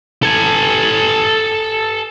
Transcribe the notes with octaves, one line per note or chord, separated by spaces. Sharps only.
A4 G#5